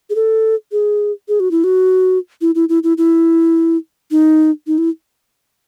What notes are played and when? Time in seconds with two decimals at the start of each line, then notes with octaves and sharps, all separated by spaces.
0.10 G#4
0.15 A4
0.72 G#4
1.28 G#4
1.40 F#4
1.51 E4
1.64 F#4
2.41 E4
2.55 E4
2.69 E4
2.83 E4
2.98 E4
4.11 D#4
4.67 D#4
4.78 E4